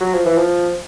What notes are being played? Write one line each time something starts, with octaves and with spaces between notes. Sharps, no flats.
F#3
F3
E3
F3